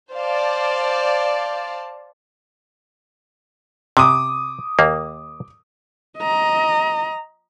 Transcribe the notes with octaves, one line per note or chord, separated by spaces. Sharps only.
C5 D5 F5 A5
C3 D6 D#6
D#2 A#3
D#5 A#5